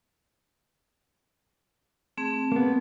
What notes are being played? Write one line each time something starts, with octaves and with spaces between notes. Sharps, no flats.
A3 C4 G#4
A#3 B3